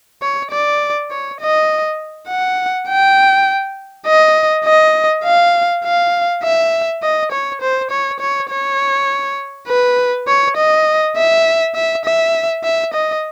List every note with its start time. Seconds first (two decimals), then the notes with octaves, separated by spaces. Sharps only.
0.22 C#5
0.51 D5
1.11 C#5
1.40 D#5
2.28 F#5
2.89 G5
4.06 D#5
4.65 D#5
5.24 F5
5.84 F5
6.43 E5
7.03 D#5
7.32 C#5
7.61 C5
7.91 C#5
8.20 C#5
8.50 C#5
9.68 B4
10.28 C#5
10.57 D#5
11.17 E5
11.75 E5
12.05 E5
12.64 E5
12.94 D#5